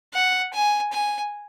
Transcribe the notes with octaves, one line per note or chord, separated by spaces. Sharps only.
F#5
G#5
G#5